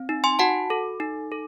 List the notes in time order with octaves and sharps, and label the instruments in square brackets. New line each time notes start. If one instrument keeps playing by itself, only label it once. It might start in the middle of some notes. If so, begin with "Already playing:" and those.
Already playing: [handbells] C4
D#4
G#5 C6
F#4 F#5 A5
A4
D#4
A4